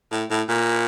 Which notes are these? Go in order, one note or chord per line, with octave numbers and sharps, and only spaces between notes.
A2
A2
A#2